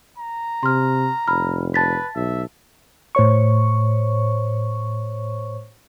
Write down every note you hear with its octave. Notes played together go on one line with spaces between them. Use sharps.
A#5
C3 C6 F6
F1 B5 F6
B4 A5 A6 B6
B1 E5
A2 C5 C#5 C#6